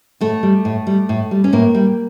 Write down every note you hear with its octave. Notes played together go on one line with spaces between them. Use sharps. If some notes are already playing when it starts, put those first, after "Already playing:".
A2 A3
G3
A2
G3
A2
G3
C#4
A2 A#3
G3